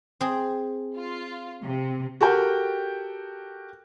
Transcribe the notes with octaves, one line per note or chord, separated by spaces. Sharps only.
C4 G#4
F4
C3
F#4 G4 A4 A#4 G5